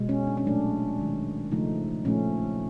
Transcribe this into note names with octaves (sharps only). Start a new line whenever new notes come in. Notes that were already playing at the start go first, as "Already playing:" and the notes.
Already playing: B2 G#3
C#4
D4
C#4
A#2 F#3 A3 D4
D#3 G#3
C#3 F3 A3 D#4
A#2 F3 A3 C#4